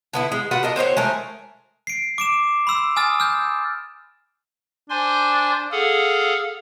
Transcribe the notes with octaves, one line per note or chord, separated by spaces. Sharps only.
D3 B3 E4
G#3
F4 F#4 B4 F#5
D4 A#4 D#5
C4 F#4 C5 C#5
G#3 A3 A#4
C7 D7
D6 D7 E7
B5 C6 E6 E7
G#5 D#6 F6 A6
F6 G6
D4 C5 G#5 C6
G#4 A4 F5 F#5